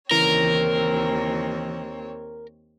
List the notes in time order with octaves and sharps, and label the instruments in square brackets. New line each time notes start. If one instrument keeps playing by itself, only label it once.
[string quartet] D#2 C4 C#5 [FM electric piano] C#3 E3 [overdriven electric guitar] A#4